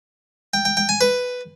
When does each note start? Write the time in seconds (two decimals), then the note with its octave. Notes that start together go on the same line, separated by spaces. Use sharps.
0.54 G5
0.65 G5
0.77 G5
0.89 G#5
1.01 B4